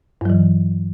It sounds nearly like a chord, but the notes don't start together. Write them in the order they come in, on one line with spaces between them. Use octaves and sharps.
G2 F#3 E3